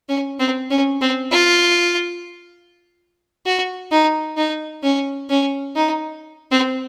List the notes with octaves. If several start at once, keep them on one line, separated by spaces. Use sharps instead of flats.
C#4
C4
C#4
C4
F4
F#4
D#4
D#4
C#4
C#4
D#4
C4